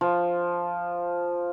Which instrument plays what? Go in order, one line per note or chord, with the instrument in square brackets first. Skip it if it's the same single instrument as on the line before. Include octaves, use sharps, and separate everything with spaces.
[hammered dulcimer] F3